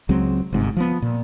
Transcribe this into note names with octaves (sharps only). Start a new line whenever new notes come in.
C#2 F#3 G#3 C4
G1 G#2 C3
F3 B3
A#2